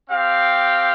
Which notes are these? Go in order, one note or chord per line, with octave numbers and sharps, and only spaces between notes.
C4 G4 F5